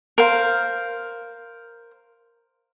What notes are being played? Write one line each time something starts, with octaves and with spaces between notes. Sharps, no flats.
A#4 C5 F5